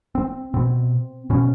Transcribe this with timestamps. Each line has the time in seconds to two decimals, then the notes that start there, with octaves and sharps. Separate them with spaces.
0.15 C4
0.54 B2 C4
1.30 B2 C#4